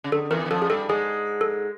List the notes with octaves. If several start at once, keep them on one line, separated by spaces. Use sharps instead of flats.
C#3
D3 A4
E2 E3 A#4
E3
F2 F3 A4
G#4
G2 G3 A4
G#2 G#3 G#4
A4